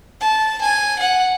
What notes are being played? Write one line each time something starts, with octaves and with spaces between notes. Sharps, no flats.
A5
G#5
F#5